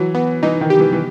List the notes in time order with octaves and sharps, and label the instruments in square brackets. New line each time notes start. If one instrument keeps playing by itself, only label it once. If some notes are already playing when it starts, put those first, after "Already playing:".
Already playing: [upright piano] E3 [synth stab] F#3
[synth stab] B3
[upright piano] E3 [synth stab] D#4
[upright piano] D#3
[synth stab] G4
[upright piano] E3
E3